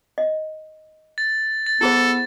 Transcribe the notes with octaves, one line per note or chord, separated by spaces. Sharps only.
D#5
A6
A6
B3 E4 G#4 A4 C5